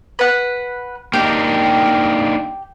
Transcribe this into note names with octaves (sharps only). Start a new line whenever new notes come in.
B4 F#5
A#3 D4 D#4 G4